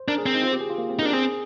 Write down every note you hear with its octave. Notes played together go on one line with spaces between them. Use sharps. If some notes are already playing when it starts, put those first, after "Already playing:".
Already playing: C5
D4 A#4
G#4
C4 C5
D#4
F4
G4
G#4
F4
A#3
C4
D#4
D4 A#4
C4 G#4